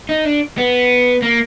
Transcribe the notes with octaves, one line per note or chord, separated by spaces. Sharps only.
D#4
D4
B3
A#3